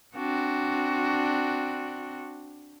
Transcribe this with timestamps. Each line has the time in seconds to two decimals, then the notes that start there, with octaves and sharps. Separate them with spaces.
0.16 C4 D4 F#4